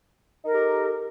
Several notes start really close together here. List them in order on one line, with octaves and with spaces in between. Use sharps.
D#4 A#4 A4 G4